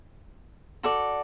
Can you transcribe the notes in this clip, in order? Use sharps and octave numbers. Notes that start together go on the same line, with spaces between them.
F#4 A4 D5